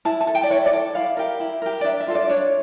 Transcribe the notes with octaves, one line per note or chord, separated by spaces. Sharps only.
E4 A5
A5
A4
G5
D5
E4 C#5
D5
A4
E4 F5
G4 A#4
E4
G4 A#4
D5
D4 E5
E5
F4 A4
D5
D4 C#5